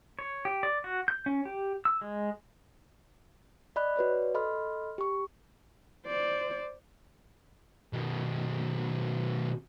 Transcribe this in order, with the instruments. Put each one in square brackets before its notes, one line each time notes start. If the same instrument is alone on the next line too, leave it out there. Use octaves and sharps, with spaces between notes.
[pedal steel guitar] C#5
G4
D5
F#4
G6
C#4
G4
E6
G#3
[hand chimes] D5 D#5 B5 F#6
F#4 B4 C#5 D5
A4 D#5 B5 C6 F6
G4 C#6
[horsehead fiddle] C5 D5
[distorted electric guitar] B2 D#3